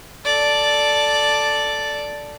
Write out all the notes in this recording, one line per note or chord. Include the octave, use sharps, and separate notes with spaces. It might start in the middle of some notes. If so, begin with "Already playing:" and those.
A4 D5